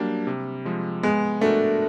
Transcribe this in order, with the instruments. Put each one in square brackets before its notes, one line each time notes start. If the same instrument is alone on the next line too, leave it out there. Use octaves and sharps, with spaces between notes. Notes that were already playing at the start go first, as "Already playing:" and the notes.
Already playing: [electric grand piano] F#3 A#3 D4 G4 [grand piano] G3
[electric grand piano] C3
F3 G#3
[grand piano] G#3 [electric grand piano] B3
[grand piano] A3 [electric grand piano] D4 F#4 A#4